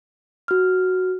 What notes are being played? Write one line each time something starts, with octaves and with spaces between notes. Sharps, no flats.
F#4 F6